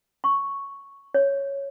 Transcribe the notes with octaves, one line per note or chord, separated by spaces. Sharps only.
C#6
C#5